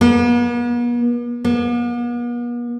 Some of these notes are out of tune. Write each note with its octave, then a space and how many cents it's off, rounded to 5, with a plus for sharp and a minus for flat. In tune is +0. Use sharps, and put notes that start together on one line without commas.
B3 -45
B3 -45